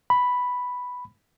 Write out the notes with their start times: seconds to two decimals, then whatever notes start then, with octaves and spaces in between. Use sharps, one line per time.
0.10 B5